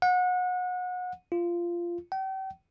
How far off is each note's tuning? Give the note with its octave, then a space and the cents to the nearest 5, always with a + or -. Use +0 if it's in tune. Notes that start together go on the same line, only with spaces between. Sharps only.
F#5 -30
F4 -15
G5 -40